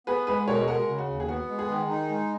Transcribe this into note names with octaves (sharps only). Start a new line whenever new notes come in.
B3 G#4 B4
G#3 G#4 B4
B2 A#4 C#5
G#4
G#3 F#4 A#4
C#3
F#4
D#2
G#4
B3 F#4
G#3
G#4
D#3
D#4
G#3